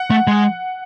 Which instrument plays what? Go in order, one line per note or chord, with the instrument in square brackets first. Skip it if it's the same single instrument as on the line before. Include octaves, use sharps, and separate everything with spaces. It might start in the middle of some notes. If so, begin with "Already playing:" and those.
Already playing: [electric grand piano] F#5
[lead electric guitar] A3
G#3